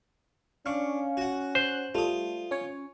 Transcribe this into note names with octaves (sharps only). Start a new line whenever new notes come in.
C#4 D4 F5 C#6
F#4 F#5
C5 F#6
G3 A3 F4 D#6
C#4 C#5